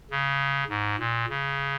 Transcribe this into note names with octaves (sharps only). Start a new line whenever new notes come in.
C#3
G#2
A#2
C#3